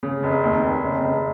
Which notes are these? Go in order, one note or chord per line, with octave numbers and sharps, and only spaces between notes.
C#3
F1
D#2
F1
C#3
F1